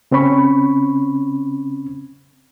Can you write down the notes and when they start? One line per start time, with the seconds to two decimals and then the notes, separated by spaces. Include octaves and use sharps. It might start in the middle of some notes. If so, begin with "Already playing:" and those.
0.11 C#3 C4 C#4 B5 C#6